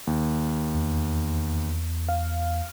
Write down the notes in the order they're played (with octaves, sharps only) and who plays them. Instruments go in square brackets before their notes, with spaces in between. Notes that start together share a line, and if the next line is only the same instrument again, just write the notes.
[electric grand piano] D#2
[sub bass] E2
[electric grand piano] F5